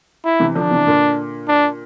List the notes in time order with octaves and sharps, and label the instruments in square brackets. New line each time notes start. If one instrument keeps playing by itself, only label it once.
[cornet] E4
[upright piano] C3 E3
[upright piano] D3 F3 [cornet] D4
[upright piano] C3 E3
A#2 D3
[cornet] D4